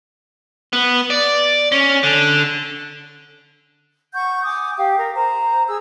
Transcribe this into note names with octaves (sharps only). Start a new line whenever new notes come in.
B3
D5
C#4
D3
F#5 C#6 G6
G#5 D6 D#6
G4 F5 G5
A#4
C5 A#5
G#4 E6